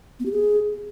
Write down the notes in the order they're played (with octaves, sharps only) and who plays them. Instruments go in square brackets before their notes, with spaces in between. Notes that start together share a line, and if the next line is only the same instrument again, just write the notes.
[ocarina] B3
G4
G#4